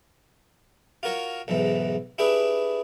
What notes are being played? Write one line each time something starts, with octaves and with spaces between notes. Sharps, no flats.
F4 F#4 A#4 C#5
B1 E2 G#2 E3
D4 E4 G4 G#4 B4